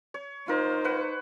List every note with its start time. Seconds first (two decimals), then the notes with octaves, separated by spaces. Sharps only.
0.14 C#5
0.48 D#4 F4 A#4 C5
0.84 B4 F#5